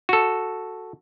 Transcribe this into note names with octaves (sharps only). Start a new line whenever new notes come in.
F#4 A4